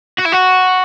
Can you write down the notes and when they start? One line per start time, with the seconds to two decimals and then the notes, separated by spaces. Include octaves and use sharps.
0.19 F#4
0.26 E4
0.33 F#4